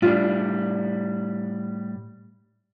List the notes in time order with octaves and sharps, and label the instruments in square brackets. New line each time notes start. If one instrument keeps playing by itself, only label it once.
[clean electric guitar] A2 G3 [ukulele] D4 F4